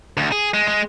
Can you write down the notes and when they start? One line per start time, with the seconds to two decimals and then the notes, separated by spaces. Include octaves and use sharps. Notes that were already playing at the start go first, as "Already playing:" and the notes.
0.17 D2
0.32 G#4
0.54 G#3
0.68 G#3